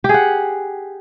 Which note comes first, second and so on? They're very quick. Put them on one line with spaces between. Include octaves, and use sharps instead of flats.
G4 G#4 F#5